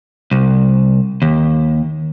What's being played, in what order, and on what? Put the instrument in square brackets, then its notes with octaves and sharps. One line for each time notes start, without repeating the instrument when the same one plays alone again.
[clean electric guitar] C2
D#2